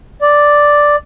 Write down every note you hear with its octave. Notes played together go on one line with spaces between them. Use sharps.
D5